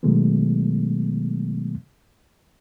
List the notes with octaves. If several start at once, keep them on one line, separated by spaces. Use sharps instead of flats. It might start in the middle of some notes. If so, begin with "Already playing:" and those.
B2 D#3 F#3 G#3 A3 B3